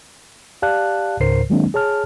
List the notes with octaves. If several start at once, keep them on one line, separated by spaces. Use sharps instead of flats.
G4 D5 F5 A5 F#6
C#2 G#2 C#3 A#4 C5 C7
D#3 F#3 G#3 A#3 C4 D4
G#4 C#5 A5 F6